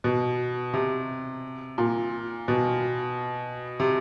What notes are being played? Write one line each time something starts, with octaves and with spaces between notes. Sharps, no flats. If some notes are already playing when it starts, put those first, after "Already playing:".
B2
C3
A#2
B2
C3